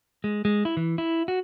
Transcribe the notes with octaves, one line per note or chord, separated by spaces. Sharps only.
G#3
G#3
E4
E3
E4
F#4